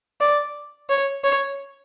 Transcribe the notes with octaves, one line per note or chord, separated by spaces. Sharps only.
D5
C#5
C#5